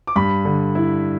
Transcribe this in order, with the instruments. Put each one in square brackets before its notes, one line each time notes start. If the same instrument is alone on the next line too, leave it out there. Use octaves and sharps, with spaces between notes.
[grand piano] D6
G2 B5
D3
E4